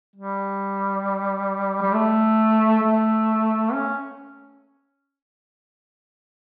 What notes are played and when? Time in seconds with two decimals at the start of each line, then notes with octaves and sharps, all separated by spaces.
0.16 G3
1.82 G3
1.94 A3
2.83 A3
3.72 C#4